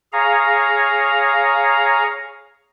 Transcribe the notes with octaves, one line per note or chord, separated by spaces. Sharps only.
G#4 C#5 F5 A#5